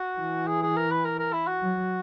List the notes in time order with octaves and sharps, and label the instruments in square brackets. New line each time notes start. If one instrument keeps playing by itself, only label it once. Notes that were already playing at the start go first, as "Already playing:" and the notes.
Already playing: [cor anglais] F#4
[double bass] E3
[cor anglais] G#4
G#4
A#4
B4
A#4
A#4
E4
F#4
[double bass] F#3